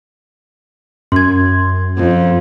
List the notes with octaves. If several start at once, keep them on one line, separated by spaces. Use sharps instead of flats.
F#2 C6 G#6
F2